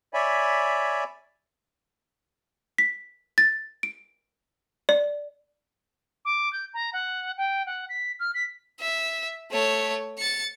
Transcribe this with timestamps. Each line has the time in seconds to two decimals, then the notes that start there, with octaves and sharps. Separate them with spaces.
0.14 C#5 D5 E5 G#5 B5
2.78 B6
3.38 A6
3.83 D7
4.89 D5
6.25 D6
6.52 G6
6.73 A#5
6.93 F#5
7.37 G5
7.66 F#5
7.89 B6
8.19 F6
8.34 B6
8.80 E5
9.51 A3 C#5
10.18 A6 C#7